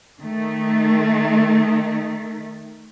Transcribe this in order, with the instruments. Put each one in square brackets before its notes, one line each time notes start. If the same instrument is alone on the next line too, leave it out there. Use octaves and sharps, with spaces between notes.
[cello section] D#3 A3